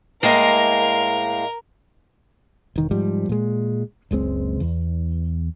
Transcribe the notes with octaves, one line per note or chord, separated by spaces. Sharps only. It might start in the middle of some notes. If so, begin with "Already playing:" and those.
A2 G#3 A#3 A#4
E1 D#3
G#2 F3 G3
A#2 G#3
F#1 C#2 G#3 C4
E2